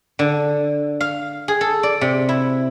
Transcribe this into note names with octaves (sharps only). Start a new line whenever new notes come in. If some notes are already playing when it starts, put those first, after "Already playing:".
D3
F5
G#4
A4
D5
C3
E4